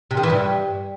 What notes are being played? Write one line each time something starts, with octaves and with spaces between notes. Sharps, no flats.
C3
D#3
E3
G2